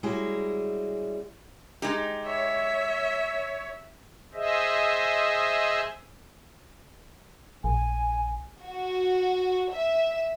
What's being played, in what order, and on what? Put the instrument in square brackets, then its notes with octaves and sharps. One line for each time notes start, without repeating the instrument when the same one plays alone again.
[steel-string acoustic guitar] G3 G#3 C#4 E4 F#4 G#4
[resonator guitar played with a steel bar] G#3 D#4 G4
[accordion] C#5 [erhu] E5
[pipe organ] G#4 C5 D#5 E5
[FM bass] A#1 [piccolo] G#5
[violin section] F#4
E5